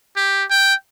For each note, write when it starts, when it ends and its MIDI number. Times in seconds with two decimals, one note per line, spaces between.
0.17 0.44 67
0.50 0.74 79